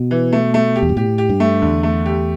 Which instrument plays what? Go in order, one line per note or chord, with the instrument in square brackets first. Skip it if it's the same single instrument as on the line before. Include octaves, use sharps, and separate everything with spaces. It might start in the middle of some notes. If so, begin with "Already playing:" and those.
Already playing: [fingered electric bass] B2
[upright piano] E3
A3
A3
G4
[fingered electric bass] E2
G2
[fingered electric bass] A2 [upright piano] G4
[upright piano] G4
[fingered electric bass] G2
[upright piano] A3
[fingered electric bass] E2 [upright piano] D3
[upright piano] A3
G4